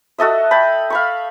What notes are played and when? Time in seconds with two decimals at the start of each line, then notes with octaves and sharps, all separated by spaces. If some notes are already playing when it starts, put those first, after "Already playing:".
0.18 F#4 A4 D#5 E5
0.51 G5 A5 B5
0.90 F5 B5 C#6